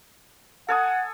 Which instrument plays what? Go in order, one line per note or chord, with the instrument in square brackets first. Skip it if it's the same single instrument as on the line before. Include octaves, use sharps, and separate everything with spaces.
[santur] A4 G#5 D#6 [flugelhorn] F#5